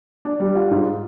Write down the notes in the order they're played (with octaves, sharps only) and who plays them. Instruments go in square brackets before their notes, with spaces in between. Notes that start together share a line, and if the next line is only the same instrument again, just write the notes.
[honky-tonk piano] D4
G3
F4
G#2